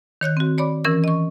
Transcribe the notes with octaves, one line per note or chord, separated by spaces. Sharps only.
D#3 C#5 F#6 G6
C4 F#4
C#5 D5 B5 D6
E3 C#4 A#4 E6
D#5 C#6